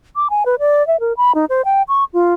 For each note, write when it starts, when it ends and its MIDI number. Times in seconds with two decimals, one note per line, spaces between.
0.16 0.28 86
0.30 0.44 80
0.46 0.55 71
0.60 0.86 74
0.87 1.00 76
1.00 1.13 70
1.17 1.32 83
1.35 1.45 63
1.49 1.62 72
1.65 1.82 79
1.88 2.04 85
2.14 2.34 65